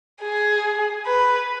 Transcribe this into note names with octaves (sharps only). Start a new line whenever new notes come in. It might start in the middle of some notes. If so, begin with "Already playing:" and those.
G#4
B4